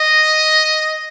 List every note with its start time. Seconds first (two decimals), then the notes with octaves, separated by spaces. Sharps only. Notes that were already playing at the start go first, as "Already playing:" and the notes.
Already playing: D#5